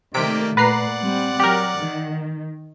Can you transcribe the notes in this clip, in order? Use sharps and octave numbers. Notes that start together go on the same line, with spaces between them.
C3 D#3 A3 A#3 G4 D5 B6 D7
A#2 B4 D5 F#5 A#5 C7
G3 C4
F#3 G4 A#4
D#3